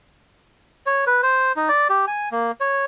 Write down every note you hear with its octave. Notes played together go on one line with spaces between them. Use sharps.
C#5
B4
C5
D#4
D5
G4
G#5
A#3
C#5